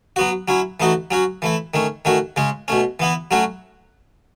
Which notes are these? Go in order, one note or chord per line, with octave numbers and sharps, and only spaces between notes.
F#3 B3 F#4
F#3 C#4 E4
E3 A3 D#4 F#4
F#3 C#4 F#4
E3 A3 E4
D#3 A3 C#4
D#3 A3 C#4 F#4
C#3 G#3 C#4
B2 A3 C#4
E3 B3 E4
F#3 A3 C#4 F#4